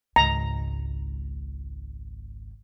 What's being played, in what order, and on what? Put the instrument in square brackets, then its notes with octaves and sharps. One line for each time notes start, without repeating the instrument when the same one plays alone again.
[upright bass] G#1 C#2 [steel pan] A#5